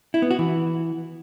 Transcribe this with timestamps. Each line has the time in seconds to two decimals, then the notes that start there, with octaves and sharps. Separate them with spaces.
0.14 E4
0.22 B3
0.31 F#4
0.39 E3